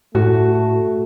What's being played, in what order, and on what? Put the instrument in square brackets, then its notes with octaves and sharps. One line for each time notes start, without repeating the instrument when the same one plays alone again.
[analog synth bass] A2 [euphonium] A3 [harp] F#4